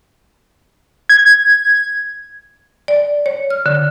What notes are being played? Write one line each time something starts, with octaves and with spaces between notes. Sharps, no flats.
G#6
D5
C#5
F6
D3